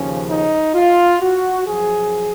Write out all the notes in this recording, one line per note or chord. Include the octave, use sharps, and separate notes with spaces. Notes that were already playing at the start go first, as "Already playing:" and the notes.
Already playing: D#2 C#3 F3 C#4
D#4
F4
F#4
F#2 F3 G#4